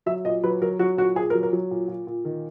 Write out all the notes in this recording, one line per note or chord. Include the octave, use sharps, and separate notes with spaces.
F#3 E5
A#2 D#5
F#3 B4
F#3 A#4
F#3 F#4
A#2 F#4
A#2 G#4
A#4
F#3
A#4
F#3
A#2
A#2
A#2
D#3